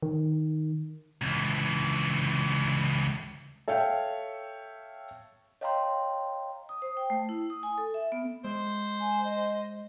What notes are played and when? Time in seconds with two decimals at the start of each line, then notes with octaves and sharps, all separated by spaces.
0.03 D#3
1.22 C#2 E3
3.68 A4 C#5 E5 F5 G5
5.61 C#5 D#5 F5 G5 A#5 C6
6.69 D#6
6.82 C5
6.97 G5
7.10 A3
7.29 E4
7.50 D#6
7.63 G#5
7.78 A4
7.94 E5
8.12 B3
8.44 G#3 C5
9.00 G#5
9.24 D#5